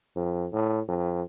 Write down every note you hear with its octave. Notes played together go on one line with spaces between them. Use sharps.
F2
A2
F2